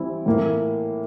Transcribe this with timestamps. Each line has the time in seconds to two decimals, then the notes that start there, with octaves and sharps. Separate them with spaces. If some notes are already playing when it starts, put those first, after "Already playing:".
Already playing: E3 G3 C4 E4
0.26 A2 E3 A#3